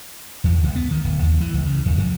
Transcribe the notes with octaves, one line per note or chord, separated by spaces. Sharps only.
E2
C#2
B3
D#3
D1
D#2
E3
C#2
C#3
D#2
F2